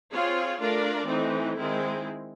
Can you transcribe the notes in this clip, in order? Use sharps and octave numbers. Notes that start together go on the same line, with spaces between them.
C4 F4 G#4 C#5
A3 D4 F4 A#4 D5
E3 A3 C4 D#4
D#3 G#3 C4 E4